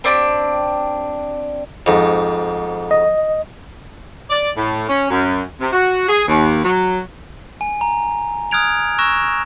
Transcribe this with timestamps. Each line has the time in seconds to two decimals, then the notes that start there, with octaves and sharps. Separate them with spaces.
0.04 C4 D4 F4 G4
1.86 F2 G#2
2.91 D#5
4.30 D5
4.56 A2
4.88 C#4
5.09 F#2
5.60 C3
5.73 F#4
6.08 G#4
6.28 D#2
6.64 F#3
7.61 G#5
7.81 A#5
8.51 D#6 F6 F#6 G#6 D7 F7
8.99 C#6 E6 F#6 A#6 E7